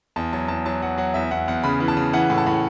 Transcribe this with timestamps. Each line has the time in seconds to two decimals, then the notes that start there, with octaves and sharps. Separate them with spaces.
0.16 E2 A5
0.33 F#3 A5
0.48 E2 A5
0.66 F#3 A5
0.82 F#3 F#5
0.98 F#3 F#5
1.14 E2 E5
1.31 E2 F#5
1.48 E2 F#5
1.64 C#3 B5
1.80 E3
1.88 A5
1.97 C#3
2.13 E3 F#5
2.30 A2
2.38 A5
2.47 A2